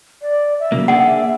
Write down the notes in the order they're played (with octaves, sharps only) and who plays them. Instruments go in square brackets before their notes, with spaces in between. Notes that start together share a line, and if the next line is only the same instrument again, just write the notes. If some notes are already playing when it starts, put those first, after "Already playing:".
[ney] D5
E5
[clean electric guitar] C#3 F#3 A#3
[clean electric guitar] A#3 D4 G#4 [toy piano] F#5